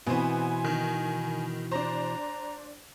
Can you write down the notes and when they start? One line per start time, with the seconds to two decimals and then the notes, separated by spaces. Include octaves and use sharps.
0.07 B2 E3 B3 C4 G#5
0.64 D#3
1.71 D4 C5 A#5